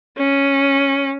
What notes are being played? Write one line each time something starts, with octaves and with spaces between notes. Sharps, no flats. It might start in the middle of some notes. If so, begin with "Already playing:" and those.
C#4